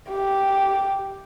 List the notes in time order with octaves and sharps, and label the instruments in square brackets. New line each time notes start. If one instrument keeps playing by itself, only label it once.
[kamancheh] G4